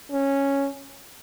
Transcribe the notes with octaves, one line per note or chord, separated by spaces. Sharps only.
C#4